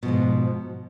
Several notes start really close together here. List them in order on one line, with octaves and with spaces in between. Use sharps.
B2 F3 G#2